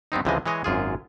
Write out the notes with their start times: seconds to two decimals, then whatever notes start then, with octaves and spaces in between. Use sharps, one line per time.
0.12 G2 B3 C4 D#4
0.25 C#2 C3 E3 F3 G#3 D#5
0.46 E3 G#3 C#5 D#5
0.64 G#1 F#2 F4 G#4